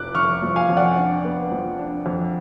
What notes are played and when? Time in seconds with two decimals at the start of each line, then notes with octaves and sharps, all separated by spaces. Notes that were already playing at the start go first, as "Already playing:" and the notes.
Already playing: F1 F3 D6 F#6
0.15 F1 C#6 F6
0.42 F3
0.56 F5 G#5
0.69 F2
0.77 D5 F#5
0.97 D4
1.25 B3
1.51 F3
1.79 D4
2.06 F2